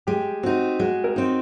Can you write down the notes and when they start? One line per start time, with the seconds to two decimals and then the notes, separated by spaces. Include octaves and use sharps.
0.07 G#3 G4
0.43 C4 D#4 F#4
0.80 G#3 F#4
1.04 A#4
1.16 C4 D#4